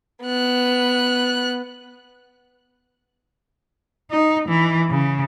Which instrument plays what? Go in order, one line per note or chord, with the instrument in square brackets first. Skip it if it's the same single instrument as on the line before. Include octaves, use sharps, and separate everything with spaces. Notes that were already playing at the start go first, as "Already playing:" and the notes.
[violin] B3 F#6
[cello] D#4
E3
C#3